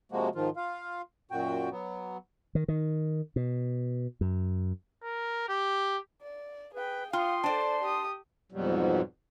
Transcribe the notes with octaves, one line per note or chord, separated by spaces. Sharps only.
C3 F3 G#3 A#3 F#4
G#2 D#3 F3 F4
F4 F5
F#2 A#2 F#4 G5
F#3 B3
D#3
D#3
B2
F#2
A#4
G4
D5
G#4 B4 G5
F4 F5 G5 C6 D#6
D4 A4 C5 D5 A5
G4 D#6
F2 G#2 B2 F#3 G3